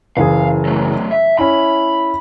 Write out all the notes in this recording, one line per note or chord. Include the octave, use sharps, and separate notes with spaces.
F#1 E3 G#4 F5
F#3 A3
E5
C#4 E4 B5